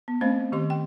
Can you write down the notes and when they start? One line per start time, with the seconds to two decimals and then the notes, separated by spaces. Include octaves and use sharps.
0.08 B3
0.21 A3 C4 C#4 C5 D#5 F5
0.52 D#3 G4 D#5 C6
0.70 G5